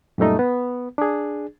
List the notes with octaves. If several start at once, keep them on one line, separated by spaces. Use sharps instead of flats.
F#2 A#2 G3 A3 D#4
B3
D4 G#4